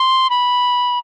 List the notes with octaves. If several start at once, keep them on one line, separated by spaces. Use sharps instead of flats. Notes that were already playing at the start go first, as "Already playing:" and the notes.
Already playing: C6
B5